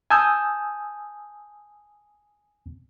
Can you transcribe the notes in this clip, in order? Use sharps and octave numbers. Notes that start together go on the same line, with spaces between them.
G#5 A5 D#6 E6 G6